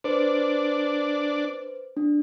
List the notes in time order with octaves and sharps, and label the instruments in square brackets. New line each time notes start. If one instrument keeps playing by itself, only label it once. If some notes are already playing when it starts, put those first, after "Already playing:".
[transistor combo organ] D4 [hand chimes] B4 C5
[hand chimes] D4